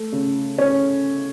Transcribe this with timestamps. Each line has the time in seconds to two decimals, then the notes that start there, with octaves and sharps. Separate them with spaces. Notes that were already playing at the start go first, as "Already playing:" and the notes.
Already playing: A3
0.13 C#3
0.58 C#4